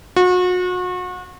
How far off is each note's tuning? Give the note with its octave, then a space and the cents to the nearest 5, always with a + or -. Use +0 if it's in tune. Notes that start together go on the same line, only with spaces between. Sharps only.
F#4 -35